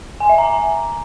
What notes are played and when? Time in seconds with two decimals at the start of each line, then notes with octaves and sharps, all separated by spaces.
0.20 G#5
0.29 E5
0.38 A#5